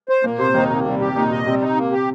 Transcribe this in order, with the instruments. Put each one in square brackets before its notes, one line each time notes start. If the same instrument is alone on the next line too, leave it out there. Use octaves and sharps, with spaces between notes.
[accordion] C5
[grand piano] A#2 [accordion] A#3
[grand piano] C3 [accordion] C5
[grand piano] D#2 D#3 [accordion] D#4
[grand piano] C3 [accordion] A#3
[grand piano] C3 [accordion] G3
[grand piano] C3 [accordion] G4
[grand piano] A#2 [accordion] D#4
[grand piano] C3 [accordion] D#5
[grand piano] C3 C4 [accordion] G3
[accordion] D#4
A#3
G4